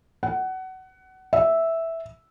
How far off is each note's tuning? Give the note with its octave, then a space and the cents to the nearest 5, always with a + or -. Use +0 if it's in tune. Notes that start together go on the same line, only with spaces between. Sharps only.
F#5 +20
E5 -5